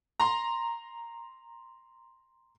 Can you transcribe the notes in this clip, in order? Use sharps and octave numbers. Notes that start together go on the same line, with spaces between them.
A#5 C6